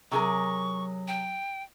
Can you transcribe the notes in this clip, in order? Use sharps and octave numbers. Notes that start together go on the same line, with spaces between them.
C3 F#3 G#4 A#4 C#6
G5